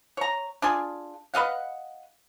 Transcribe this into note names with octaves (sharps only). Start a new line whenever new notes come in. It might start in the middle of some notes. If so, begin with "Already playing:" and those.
C#5 A#5
D4 F4 G#4
B4 D#5 F5 F#5